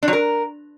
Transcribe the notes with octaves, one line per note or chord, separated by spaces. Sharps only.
D4
F#3
A#4